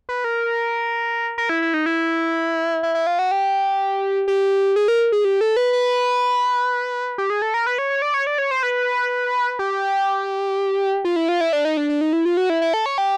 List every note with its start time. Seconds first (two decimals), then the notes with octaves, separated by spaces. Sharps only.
0.09 B4
0.24 A#4
1.38 A#4
1.49 E4
1.62 E4
1.74 D#4
1.86 E4
2.83 E4
2.95 E4
3.07 F4
3.19 F#4
3.31 G4
4.28 G4
4.76 G#4
4.88 A#4
5.12 G#4
5.25 G4
5.41 A4
5.57 B4
5.73 B4
7.18 G4
7.30 G#4
7.42 A4
7.54 A#4
7.67 B4
7.78 C#5
7.90 C#5
8.02 D5
8.14 C#5
8.27 D5
8.38 C#5
8.51 C5
8.63 B4
9.59 G4
11.05 F4
11.16 E4
11.29 F4
11.41 E4
11.53 D4
11.65 D#4
11.77 D4
11.89 D4
12.01 D#4
12.13 E4
12.25 F4
12.37 F#4
12.50 E4
12.62 E4
12.74 A4
12.86 C#5
12.98 G4